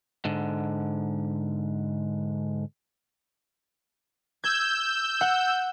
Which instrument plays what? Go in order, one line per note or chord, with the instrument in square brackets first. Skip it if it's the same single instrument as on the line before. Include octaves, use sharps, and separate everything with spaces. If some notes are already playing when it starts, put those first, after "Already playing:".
[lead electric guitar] G#2 D3
[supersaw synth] E6 G6 [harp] G#6
[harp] F#5